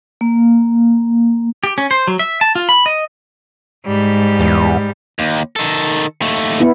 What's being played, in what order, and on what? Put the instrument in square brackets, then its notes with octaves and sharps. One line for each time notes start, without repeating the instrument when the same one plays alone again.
[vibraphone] A#3
[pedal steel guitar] G4
C#4
C5
F#3
E5
A5
F4
B5
D#5
[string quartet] G#2 G3
[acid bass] E2
[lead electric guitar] D#2
D#3 A4
D#2 A3
[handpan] B3 E4